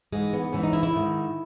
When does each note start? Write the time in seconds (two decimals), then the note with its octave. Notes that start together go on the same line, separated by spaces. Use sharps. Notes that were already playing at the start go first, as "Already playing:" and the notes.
0.12 G#2 E3 G#3
0.33 B3
0.52 G#2 E3 C#4
0.63 D#4
0.73 E4
0.83 E4
0.93 G#2 D#3